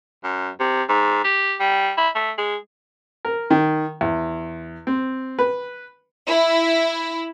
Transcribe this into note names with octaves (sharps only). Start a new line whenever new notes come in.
F#2
C3
G#2
G4
G3
E4
A3
G#3
A#4
D#3
E2
C4
B4
E4